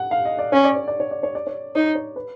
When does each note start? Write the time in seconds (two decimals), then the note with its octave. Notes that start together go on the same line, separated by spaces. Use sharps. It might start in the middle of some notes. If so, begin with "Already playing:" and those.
Already playing: F#5
0.11 F5
0.25 D#5
0.39 D5
0.52 C#4 C#5
0.64 D5
0.76 C#5
0.88 D5
1.00 C#5
1.11 D5
1.23 C#5
1.35 D5
1.47 C#5
1.75 D#4 C#5
1.95 C#5
2.16 B4